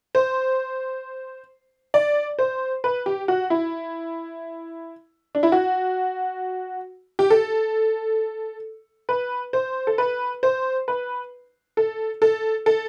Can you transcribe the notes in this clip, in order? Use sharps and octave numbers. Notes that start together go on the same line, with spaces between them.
C5
D5
C5
B4
G4
F#4
E4
D4
E4
F#4
G4
A4
B4
C5
A4
B4
C5
B4
A4
A4
A4